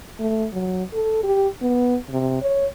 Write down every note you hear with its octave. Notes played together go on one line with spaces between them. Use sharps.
A3
F#3
A4
G4
B3
C3
C#5